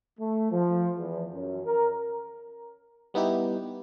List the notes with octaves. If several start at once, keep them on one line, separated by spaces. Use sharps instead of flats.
A3
F3
E2
F#2
A#4
G3 B3 D#4 E4 G4